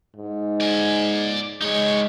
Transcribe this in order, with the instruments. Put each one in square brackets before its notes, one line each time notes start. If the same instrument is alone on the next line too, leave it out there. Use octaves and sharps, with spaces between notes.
[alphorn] G#2
[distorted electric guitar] D5 G#5
[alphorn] G#3 [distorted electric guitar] D#4 C#5